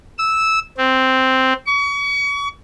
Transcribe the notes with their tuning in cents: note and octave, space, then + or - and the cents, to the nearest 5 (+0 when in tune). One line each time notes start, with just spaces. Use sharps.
E6 -10
C4 +0
C#6 +35